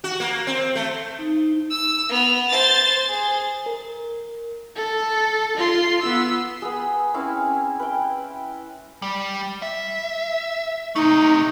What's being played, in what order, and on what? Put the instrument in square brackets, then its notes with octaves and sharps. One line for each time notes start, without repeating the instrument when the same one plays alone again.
[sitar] F#4
A#3
C4
A3
[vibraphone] D#4
[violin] E6
B3 F7
C5 A6
G#4
[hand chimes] A#4
[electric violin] A4
F4 C6
B3 E6
[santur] B3 G#4
C4 C#4 E4 F5
B4 G5
[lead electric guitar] G3
E5
[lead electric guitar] C3 A3 [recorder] D#4